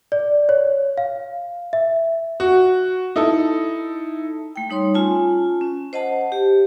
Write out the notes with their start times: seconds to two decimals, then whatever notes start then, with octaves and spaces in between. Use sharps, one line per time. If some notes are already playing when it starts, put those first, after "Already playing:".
0.12 D5
0.49 C#5
0.97 F5
1.73 E5
2.40 F#4
3.16 D#4 E4 A4
4.56 A3 G5
4.70 G3 D#4 C#5 C6
4.94 C#4 F4 G#5 A5
5.61 C#4
5.93 C5 D#5 F#5 A5
6.32 G4